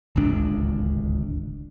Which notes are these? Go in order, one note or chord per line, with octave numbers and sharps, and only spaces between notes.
D1 G#1 C#2 D4